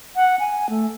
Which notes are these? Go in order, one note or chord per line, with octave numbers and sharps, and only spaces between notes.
F#5
G#5
A3